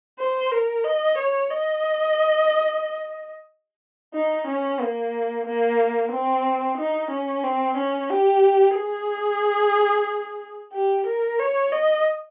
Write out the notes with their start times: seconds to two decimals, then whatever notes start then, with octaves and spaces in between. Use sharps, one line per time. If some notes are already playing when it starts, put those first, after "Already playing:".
0.19 C5
0.52 A#4
0.85 D#5
1.18 C#5
1.51 D#5
4.14 D#4
4.47 C#4
4.80 A#3
5.46 A#3
6.12 C4
6.78 D#4
7.11 C#4
7.44 C4
7.77 C#4
8.10 G4
8.76 G#4
10.74 G4
11.07 A#4
11.39 C#5
11.72 D#5